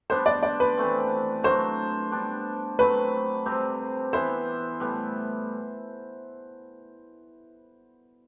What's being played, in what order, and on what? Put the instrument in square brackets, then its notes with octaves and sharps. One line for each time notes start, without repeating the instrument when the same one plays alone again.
[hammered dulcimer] G3 B3 D4 [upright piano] C5
[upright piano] D5
D5
B4
[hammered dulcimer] E3 A3 C4
[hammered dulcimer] F#3 A3 D4 [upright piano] C5
[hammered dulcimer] G3 B3 D4
[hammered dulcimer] F#3 A3 C4 [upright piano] B4
[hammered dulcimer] C3 G3 C4 G4
[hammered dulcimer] E3 B3 E4 [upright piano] C5
[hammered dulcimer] A2 G3 B3